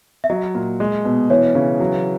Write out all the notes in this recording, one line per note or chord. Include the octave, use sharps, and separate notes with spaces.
E5
F#3 D#5
A#2
G#3
B2
E3 C#5
C#3
F#3